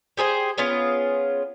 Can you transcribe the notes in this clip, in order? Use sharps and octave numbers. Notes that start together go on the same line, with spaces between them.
G4 G#4 C5 G5
B3 C#4 F4 G#4